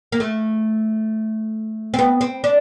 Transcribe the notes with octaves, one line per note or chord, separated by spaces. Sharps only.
A#3
A3
C4
B3
C4
D4